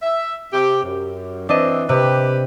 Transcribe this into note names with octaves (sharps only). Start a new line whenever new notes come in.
E5
C3 G4
F#2
E3 C4 D4 D#5
C3 G4 B4